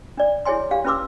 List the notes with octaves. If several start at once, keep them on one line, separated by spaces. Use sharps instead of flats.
D4 D5
E4 G#4 C#5 G#5 C6
D4 G4 F5
C#4 F4 B4 C6 D6 E6